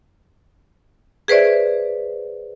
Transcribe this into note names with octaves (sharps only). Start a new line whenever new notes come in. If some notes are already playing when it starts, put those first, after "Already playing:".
G#4 B4 C5 D5 E5